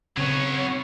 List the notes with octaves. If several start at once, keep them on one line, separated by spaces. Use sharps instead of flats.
C#3 F#3 B3 C4 C#5